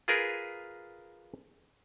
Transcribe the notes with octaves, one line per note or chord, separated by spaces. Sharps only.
F4 G#4 A#4 B4